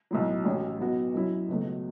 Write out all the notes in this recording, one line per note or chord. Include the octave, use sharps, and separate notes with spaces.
B1 A2 F#3
A1 A2 F#3 C#4
B1 B2 B3 F#4
F#2 F#3 C#4 E4
C#2 B2 F#3 A3